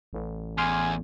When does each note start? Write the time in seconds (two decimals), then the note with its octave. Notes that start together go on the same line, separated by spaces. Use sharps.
0.13 A1
0.58 E2 G#5 C6 F6